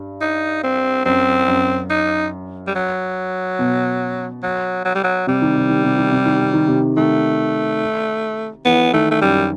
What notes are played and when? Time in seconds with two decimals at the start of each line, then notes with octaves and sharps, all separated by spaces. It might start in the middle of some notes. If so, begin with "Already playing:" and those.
Already playing: G2
0.21 D#4
0.63 C4
1.05 F#2 C4
1.48 F#2
1.90 D#4
2.67 G3
2.75 F#3
3.59 B2
4.43 F#3
4.85 F#3
4.95 G3
5.04 F#3
5.27 C3 G3
5.42 D#3
5.56 C3
5.69 D#3
5.84 C3
5.98 D#3
6.11 C3
6.26 D#3
6.40 C3
6.53 D#3
6.67 C3
6.96 D#3 A3
8.65 E3 B3
8.93 D#3 A3
9.11 A3
9.21 F#2 G3